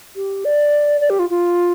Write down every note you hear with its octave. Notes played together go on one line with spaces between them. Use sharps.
G4
D5
D5
G4
F4
F4